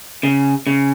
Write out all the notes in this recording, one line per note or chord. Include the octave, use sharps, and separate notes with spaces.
C#3
C#3